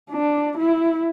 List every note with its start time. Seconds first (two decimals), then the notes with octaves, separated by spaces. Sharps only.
0.10 D4
0.58 E4